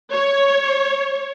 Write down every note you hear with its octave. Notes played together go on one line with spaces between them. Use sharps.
C#5